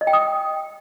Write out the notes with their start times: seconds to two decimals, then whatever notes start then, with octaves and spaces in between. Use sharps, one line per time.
0.01 D#5
0.07 G5
0.13 D#6